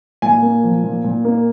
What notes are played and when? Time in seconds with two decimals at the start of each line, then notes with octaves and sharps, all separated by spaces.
0.22 A#2 G#5
0.42 A#3
0.64 F3
0.84 A#2
1.04 A#2
1.25 A#3